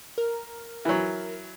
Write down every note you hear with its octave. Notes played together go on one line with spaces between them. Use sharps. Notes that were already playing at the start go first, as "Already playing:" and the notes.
A#4
E3 F#3